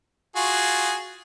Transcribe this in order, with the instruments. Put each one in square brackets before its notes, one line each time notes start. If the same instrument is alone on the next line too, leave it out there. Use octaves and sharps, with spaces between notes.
[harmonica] F4 F#4 G#4